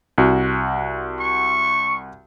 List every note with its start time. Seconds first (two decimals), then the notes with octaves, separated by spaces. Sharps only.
0.18 C2 F#4
1.20 C#6